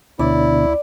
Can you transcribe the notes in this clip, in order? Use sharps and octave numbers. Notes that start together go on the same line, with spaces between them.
D2 B2 D3 E4 D5